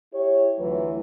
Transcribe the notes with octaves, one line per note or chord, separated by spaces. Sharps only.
E4 G4 C#5
D2 E3 F#3 F4 B4